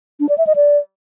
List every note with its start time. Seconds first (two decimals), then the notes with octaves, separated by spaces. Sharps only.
0.20 D4
0.29 D5
0.38 E5
0.47 D#5
0.56 D5